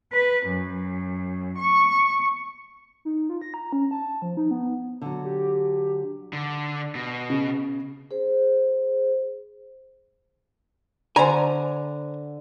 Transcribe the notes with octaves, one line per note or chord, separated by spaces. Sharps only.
B4
F#2
C#6
D#4
F4
A#6
A#5
C#4
A5
F3
D#4
B3
D3 F#3
G4
D3
B2
C#3
G#4 C5
D3 C5 G#5 A#5